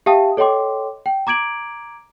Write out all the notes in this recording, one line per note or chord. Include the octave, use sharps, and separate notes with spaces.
G4 E5 F5 G5 A5 D#6
A4 C#5 D#5 G5 C6 D6
G5
A#5 D6 G#6 D7 F#7